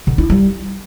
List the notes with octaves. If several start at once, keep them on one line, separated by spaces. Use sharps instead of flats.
D3
E4
G3